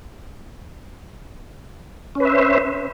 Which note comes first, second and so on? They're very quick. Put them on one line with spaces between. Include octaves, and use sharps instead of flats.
C#4 B4 E5 C5